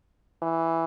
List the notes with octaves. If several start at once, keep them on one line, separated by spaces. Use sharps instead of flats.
E3